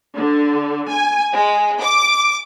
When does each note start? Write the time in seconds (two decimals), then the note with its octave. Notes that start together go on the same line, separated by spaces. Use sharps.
0.16 D3
0.92 G#5
1.35 G#3
1.83 D6